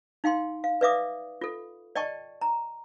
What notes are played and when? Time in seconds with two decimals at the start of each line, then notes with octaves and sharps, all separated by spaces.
0.24 D#4 F5 G5 C6
0.64 F5
0.81 B4 D5 E5 F5 D6 D#6
1.41 F4 A4
1.96 D5 D#5 G5 A5 C#6
2.41 A#5